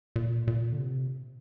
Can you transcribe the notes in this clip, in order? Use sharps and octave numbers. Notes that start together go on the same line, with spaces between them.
A#2
A#2
D3
C3